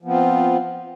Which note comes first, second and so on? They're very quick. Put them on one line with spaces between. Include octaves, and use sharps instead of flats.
F3 B3 C4 F4